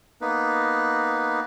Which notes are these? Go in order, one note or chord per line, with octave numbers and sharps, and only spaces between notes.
A#3 B3 D#4 B4